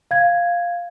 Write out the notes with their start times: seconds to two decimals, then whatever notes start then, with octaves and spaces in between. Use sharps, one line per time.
0.11 F5 G#6